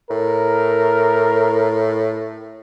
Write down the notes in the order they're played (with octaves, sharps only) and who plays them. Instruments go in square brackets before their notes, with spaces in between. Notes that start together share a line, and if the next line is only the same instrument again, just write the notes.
[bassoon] A2 [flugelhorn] A#4